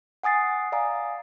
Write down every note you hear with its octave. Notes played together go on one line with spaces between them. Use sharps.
F#5 G#5 D#6 A6 C7
D5 F5 G#5 A#5 D#6